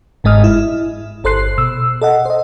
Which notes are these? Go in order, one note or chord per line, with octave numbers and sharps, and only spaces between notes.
G1 G#2 G#3 D#5 D#6 F6
E4
G1 A4 C5 C6 F#6 C7
B2 E6
A4 D#5 F#5
C5 D#5